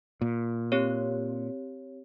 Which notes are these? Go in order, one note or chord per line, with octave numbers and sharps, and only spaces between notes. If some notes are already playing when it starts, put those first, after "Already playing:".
A#2
C4 G4 C#5